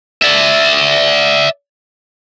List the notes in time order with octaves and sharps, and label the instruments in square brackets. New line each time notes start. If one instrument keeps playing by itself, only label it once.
[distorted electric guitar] D5 E5